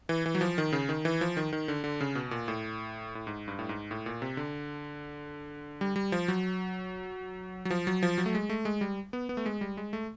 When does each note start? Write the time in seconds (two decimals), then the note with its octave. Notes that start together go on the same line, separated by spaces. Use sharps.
0.09 E3
0.26 E3
0.35 F#3
0.41 F3
0.58 D#3
0.73 C#3
0.89 D#3
1.05 E3
1.21 F3
1.37 D#3
1.53 D#3
1.68 D3
1.84 D3
2.01 C#3
2.15 B2
2.31 A#2
2.48 A2
3.15 A2
3.27 G#2
3.48 G2
3.59 A2
3.69 G#2
3.91 A2
4.06 A#2
4.22 C3
4.37 D3
5.81 G3
5.96 G3
6.12 F3
6.28 F#3
7.65 F#3
7.70 F3
7.87 F#3
8.03 F3
8.18 F#3
8.26 A3
8.35 G#3
8.50 A3
8.65 G#3
8.81 G3
9.13 B3
9.29 B3
9.37 A3
9.46 G#3
9.61 G3
9.77 G#3
9.93 A3